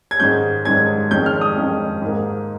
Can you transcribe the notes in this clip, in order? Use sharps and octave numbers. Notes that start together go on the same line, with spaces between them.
G#6
G#2 D#3 G#3 C#4 G6
G#2 D#3 G#3 C#4 G#6
F2 D#3 G#3 C#4 G6
F6
D#6
F2 D#3 G#3 C#4
G#2 D#3 A#3